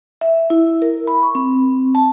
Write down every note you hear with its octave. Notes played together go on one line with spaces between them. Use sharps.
E5
E4
A#4
B5
C#6
C4
A5